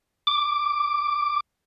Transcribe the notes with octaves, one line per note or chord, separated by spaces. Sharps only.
D6